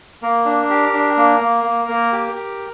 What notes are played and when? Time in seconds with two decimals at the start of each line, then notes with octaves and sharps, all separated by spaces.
0.23 A#3 A#4
0.45 D4
0.70 G4
0.93 D4
1.17 A#3
1.41 A#3
1.64 A#3
1.89 A#3
2.13 G4
2.35 G4